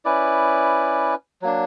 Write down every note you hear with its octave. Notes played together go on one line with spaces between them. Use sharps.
C#4 E4 B4 D5
F#3 A#3 D4